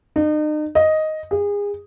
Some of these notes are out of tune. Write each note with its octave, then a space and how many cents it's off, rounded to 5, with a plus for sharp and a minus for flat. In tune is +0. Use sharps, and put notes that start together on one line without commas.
D#4 -40
D#5 +5
G#4 -30